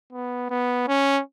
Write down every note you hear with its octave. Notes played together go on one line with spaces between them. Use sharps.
B3
B3
C#4